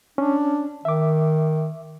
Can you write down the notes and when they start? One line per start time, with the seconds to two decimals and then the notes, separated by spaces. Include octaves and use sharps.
0.18 C#4 D4
0.85 D#3 E5 D6